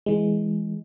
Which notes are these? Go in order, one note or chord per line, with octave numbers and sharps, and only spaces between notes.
E3 G#3